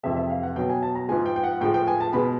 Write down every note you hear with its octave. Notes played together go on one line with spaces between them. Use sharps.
F2 C3 E3 G#3 E5
E5
F5
F#5
B2 F#3 G5
G#5
A5
A#5
G#2 F3 G#3 G#5
G5
G5
F#5
A2 F3 G#3 G5
G5
G#5
A5
B2 G#3 B5